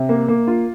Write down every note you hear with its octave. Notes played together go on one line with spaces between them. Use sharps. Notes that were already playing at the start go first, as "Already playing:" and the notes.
Already playing: C3
A#3
A#3
F4